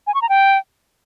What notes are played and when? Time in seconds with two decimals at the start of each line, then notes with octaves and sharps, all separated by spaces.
0.07 G#5
0.14 C#6
0.22 A#5
0.29 G5